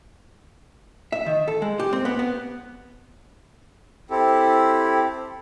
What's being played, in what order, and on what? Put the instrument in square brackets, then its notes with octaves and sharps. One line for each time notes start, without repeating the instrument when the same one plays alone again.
[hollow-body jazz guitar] E5
D#3
A4
G#3
G4
C4
B3
B3
[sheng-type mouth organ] C4 E4 G4 A4